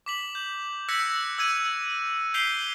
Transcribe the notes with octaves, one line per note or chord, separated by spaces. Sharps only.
D6 B6 F#7
G6
E6 F#6 G#6 A#6 B6 C#7
E6 G#6 D#7
G6 B6 C7 D7 F7 G7